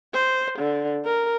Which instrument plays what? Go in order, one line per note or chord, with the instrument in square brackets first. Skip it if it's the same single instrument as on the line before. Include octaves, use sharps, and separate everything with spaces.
[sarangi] C5
D3
A#4